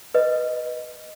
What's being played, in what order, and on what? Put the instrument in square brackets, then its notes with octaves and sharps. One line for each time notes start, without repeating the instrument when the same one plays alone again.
[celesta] B4 D#5